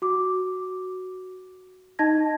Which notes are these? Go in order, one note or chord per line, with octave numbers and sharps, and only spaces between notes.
F#4 D6
D#4 D#5 A5 G#6 A#6